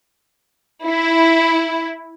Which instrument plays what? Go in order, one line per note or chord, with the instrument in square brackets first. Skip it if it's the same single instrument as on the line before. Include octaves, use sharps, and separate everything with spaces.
[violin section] E4